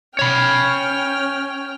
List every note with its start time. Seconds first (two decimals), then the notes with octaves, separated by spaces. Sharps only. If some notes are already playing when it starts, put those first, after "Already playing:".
0.19 C#4 C#5 G5 B5 F6